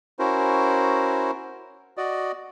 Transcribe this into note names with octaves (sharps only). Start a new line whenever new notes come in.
C#4 E4 F#4 A#4 C5
F#4 D5 D#5